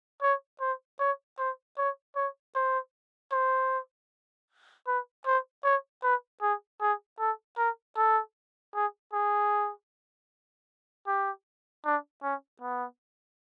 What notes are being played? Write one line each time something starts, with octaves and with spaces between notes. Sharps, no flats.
C#5
C5
C#5
C5
C#5
C#5
C5
C5
B4
C5
C#5
B4
G#4
G#4
A4
A#4
A4
G#4
G#4
G4
D4
C#4
B3